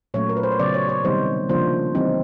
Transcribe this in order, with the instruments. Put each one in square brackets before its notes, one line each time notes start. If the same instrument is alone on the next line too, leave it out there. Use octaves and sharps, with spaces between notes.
[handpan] A#2 F#3 A3 C#4 C#5
A#4
B4
C5
C#5
C#3 F#3 B3 D5
C#5
C#5
C3 D#3 G3 B3 D#4 C5
C#3 F3 A#3 D4 C5
E3 G3 C4 D#4